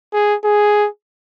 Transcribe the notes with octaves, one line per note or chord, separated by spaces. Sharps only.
G#4
G#4